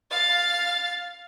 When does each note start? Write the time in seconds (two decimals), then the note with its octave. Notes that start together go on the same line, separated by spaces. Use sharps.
0.11 F5 A6